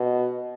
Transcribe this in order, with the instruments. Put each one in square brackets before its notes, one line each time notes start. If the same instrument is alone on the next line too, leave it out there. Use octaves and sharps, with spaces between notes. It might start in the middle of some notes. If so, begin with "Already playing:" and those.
Already playing: [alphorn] B2